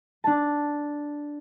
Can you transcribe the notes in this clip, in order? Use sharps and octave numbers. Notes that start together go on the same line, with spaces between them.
D4 A5